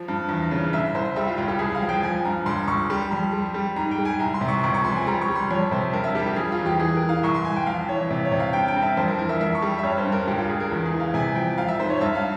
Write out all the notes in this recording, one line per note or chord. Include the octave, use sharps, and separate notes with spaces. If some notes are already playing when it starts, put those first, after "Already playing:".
Already playing: F3
G2
E2
C#3
C2 E5
C2 C5
G3 E5
F4
C#2 F4
G4
C2 G#4
F5
F3
G5
F3 G#5
G2 A#5
C#2 C6
C#2 C#6
G3 C6
F2 C6
G3
G3
G#2 A#5
G5
G3
G#5
C2 A#5
C6
C3
C#6
C#2 C#6
C#6
F3 C6
G#5
G3 A#5
C#6
G3
C6
F2 C#5
C3 C5
G2 A#4
E5
G3 G4
G4
F3 G#4
F4
E2
G4
E3 G#4
A#4
E3
F5
C2 C#6
C6
C2 G#5
G5
F2 F5
E3 C#5
C3
C#5
C3
F5
G2 G5
G5
G2
E5
F2 C5
A#4
E3 A#4
E5
F2 E5
C#6
G3
E5
G2 C#5
C5
G2
A#4
C#2 G4
F4
C#2 G#4
A#4
E2
G#4
E3
F5
C3 G#5
F3 G5
F3 F5
E5
G#2 C5
C#5
G2 E5
F5